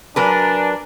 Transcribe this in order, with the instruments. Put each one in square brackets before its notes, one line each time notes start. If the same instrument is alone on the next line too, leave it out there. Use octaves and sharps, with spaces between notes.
[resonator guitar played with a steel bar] F#3 A#4 B4 [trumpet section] D4 [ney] G#5